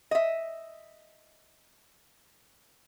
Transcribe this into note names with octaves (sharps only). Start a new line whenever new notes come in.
D#5 E5